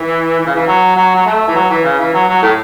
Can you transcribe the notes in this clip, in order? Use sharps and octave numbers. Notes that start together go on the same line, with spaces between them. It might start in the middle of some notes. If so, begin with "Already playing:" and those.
Already playing: E3
E3
C#3
E3
F#3
F#3
F#3
A3
E3
F#3
E3
C#3
E3
F#3
F#3
A2